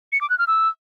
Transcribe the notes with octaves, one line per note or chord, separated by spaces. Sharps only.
C#7
D6
F#6
F6
E6